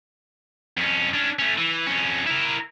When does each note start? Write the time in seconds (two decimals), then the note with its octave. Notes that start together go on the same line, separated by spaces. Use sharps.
0.77 F2 C#4
1.14 C#4 D4
1.39 A3 C#4
1.58 E3
1.87 F2 C#4
2.26 E4 A#4